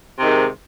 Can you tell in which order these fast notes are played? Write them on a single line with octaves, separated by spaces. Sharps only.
C3 D#3 G#2